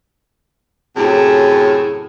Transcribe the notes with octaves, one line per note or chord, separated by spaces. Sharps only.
F#2 A2 C3 G#4